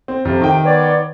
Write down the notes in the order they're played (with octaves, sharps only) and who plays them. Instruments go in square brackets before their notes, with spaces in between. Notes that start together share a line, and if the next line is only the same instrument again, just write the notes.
[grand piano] C4
[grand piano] F2 [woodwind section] C3
[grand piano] D#3 G5
[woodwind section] B3 C#5 D5